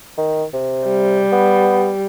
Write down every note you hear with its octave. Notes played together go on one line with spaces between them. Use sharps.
D#3
C3
G3
B3